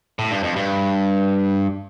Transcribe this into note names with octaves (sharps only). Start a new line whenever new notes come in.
A2
G2
F2
G2